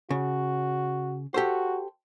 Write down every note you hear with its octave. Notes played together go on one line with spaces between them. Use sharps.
C#3 F#4
F#4 G4 A4 C5